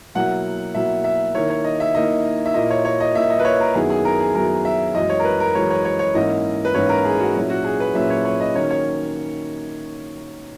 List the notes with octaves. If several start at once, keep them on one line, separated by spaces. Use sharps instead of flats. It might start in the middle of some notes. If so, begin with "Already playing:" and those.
B2 F#3 A#3 E4 F#5
B2 F#3 A#3 E4 E5
E5
D#3 A#3 E4 C#5
C#5
D#5
E5
D#3 A#3 E4 D#5
E5
A#2 A#3 E4 D#5
C#5
C#5
D#5
A#2 A#3 E4 E5
D#5
B4
C#5
A#4
F#2 D#3 F#3 B3 E4 G#4
G#4
A#4
G#4
F#2 D#3 F#3 B3 E4 A#4
E5
F#2 E3 G#3 D#5
C#5
A#4
B4
A#4
F#2 E3 G#3 C#5
C#5
C#5
C#5
G#2 E3 A#3 C#4 E4 D#5
B4
G#2 E3 A#3 C#4 E4 C#5
A#4
G#4
F#4
A#2 F#3 C#4 E4
F#4
G#4
B4
A#2 F#3 C#4 E4 E5
C#5
C#5
D#5
D#3 F#3 A#3 C#4 C#5
C#5